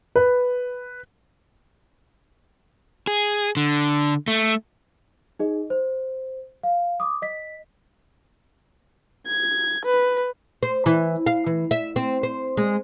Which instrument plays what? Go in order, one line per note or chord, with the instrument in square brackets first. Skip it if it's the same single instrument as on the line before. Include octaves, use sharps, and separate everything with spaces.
[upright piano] B4
[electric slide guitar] G#4
D3
A3
[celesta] D#4 G#4 D#5
C5
F5
D6 D#6
D#5 B6
[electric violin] G#6
B4
[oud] C5
E3
F5
E3
E5
C4
C5
G#3